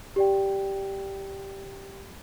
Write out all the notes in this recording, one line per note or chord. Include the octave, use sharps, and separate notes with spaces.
G4 D5 G5